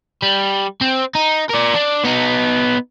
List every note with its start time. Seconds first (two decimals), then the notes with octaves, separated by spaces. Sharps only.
0.22 G3
0.81 C4
1.15 D#4
1.49 A#4 D5
1.74 D4
2.04 B3 D#4